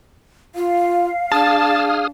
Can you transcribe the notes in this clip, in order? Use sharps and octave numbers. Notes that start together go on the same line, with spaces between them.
F4 F5
D4 G#4 A5 D#6 F6